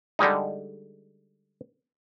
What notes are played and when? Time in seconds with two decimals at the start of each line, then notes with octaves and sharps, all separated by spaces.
0.19 D3 G3 G#3 D#4